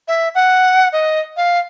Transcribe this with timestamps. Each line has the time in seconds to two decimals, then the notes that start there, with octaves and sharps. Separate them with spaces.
0.08 E5
0.35 F#5
0.92 D#5
1.37 F5